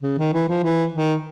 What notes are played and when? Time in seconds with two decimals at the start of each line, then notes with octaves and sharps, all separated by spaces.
0.03 C#3
0.18 D#3
0.34 E3
0.49 F3
0.64 E3
0.94 D#3